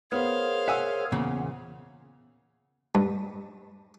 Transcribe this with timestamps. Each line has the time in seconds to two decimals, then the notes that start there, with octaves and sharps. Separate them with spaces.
0.12 B3 G#4 A#4 C5 C#5 F5
0.68 E5 F#5 G#5 E6
1.12 E2 A#2 C#3 B3
2.95 G2